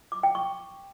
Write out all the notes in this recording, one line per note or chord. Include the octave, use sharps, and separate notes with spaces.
D6
G5
C#6